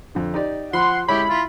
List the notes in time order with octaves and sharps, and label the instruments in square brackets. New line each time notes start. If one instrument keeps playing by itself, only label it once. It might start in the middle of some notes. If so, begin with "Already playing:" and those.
[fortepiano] F2 D3
D#4 G4 D5
[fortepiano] F3 B5 [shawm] F#5 [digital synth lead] C6
[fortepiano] G#3 E4 C#5 [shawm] G4 [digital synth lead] B5
[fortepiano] E4 [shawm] F4